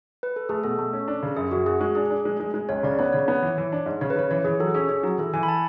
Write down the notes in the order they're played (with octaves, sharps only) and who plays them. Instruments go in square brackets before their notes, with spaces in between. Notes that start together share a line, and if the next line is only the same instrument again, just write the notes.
[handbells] B4
A4
[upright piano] A3 [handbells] G#4
[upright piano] B2 [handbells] A4
[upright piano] A3
C#4
D4
C#3
[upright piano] F#2 [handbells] G#4
[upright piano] F#2 [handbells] F#4
[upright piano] F#4 [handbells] G#4
[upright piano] G#3
[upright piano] D4 [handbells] G#4
[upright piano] D4
G#3
G#3
G#3
[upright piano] C#2 [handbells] C#5
[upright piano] C#3 [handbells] D5
[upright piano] B3 [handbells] C#5
[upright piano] C#3 [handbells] C#5
[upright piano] B3
E3
E3
D4
G#2
[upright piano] C#3 [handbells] C#5
[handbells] B4
[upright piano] C#3 [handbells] C#5
[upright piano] E3 [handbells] C#5
[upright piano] E3 [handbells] G#4
[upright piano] F#3 [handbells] A4
[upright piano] C#4 [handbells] G#4
[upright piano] C#4 [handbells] G#4
[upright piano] F#3
[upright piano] E3 [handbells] A4
[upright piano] E3 [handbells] G#5
[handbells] B5
A5